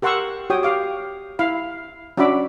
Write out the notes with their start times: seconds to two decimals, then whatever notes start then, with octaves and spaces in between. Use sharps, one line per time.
0.02 G4 A#4 F#5 C6 C#6 E6
0.50 F#4 G4 C#5 G5 D#6
0.63 G4 F5 D6
1.39 E4 F5 B5
2.17 C#4 D4 F#4 E5 B5 D6